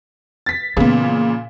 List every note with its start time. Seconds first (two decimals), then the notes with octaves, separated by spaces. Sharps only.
0.46 A6 B6
0.77 A#2 C#3 E3 B3